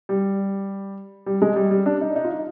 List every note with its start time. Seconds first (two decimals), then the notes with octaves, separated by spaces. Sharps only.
0.09 G3
1.26 G3
1.42 G#3
1.56 G3
1.71 G3
1.86 D4
2.01 D#4
2.16 D#4
2.24 F4
2.30 D#4